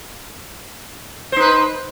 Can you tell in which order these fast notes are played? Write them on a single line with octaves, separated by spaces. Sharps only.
C5 D#4 B4